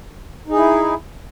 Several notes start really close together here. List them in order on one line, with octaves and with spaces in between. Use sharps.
D#4 G#4 E4